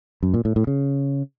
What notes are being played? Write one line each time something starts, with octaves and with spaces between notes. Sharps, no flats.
F#2
A#2
A2
A2
C#3